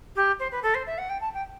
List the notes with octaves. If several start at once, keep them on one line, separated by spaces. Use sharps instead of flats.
G4
C5
B4
A4
C5
E5
F#5
G5
A5
G5